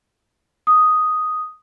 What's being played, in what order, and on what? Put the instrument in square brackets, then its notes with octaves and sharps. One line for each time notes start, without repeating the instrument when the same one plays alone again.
[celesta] D#6